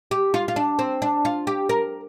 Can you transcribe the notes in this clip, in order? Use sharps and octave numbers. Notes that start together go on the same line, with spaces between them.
G4
F4
F4
D4
C4
D4
F4
G4
A#4